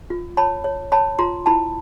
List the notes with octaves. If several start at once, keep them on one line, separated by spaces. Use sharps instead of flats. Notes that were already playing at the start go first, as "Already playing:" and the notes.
F4
C#5 A5 B5
C#5
C#5 A5 B5
F4 A#5 C6
E4 A5 B5